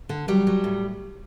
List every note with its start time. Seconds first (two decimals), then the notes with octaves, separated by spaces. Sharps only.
0.09 D3
0.28 F#3 G3
0.47 F#3
0.64 A2